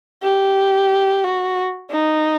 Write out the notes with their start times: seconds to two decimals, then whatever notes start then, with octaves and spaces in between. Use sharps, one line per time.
0.23 G4
1.24 F#4
1.92 D#4